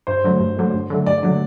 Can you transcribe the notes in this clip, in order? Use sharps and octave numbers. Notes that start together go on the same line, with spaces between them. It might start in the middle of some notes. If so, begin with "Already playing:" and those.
G2 C5
D3 F#3 A3
G2
D3 F#3 A3
G2
D3 F#3 A3
G2 D5
D3 F#3 A3